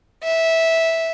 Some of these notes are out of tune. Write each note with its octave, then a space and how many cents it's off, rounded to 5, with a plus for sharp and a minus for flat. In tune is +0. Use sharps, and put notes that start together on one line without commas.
E5 -10